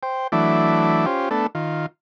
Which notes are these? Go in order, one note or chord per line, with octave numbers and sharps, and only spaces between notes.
C5 G5
E3 F#3 A3 D4 E4 D6
C#4 F4 G4 C5
A3 B3 D4 A4
D#3 F4